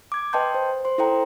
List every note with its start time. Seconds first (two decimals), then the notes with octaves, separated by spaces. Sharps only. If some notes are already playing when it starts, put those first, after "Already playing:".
0.12 D6 G#6
0.33 B4 D#5 G5 A5 C6 G6
0.55 C5
0.85 C5 C6
0.98 E4 A4 C5 G5 A#5